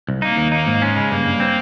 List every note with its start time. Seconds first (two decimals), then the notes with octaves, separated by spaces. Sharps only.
0.09 C2
0.22 A#3 D#4
0.37 D#2
0.52 A#3 D#4
0.67 G#2
0.81 G#3 C#4
0.96 C#3
1.11 G2 A#3
1.26 G2
1.40 C4